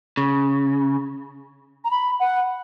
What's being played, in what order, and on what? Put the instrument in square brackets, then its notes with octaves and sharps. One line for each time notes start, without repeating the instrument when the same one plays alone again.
[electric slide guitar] C#3
[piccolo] A#5
B5
F#5